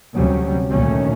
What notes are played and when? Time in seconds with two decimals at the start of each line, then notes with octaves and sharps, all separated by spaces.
0.13 D2 C3 F#3 G3 C#4
0.71 D2 A#2 D3 D#3 A3 C#4